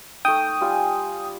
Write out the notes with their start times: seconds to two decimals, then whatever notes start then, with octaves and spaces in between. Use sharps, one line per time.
0.25 A3 D#4 G5 D#6
0.61 G3 F4 G#5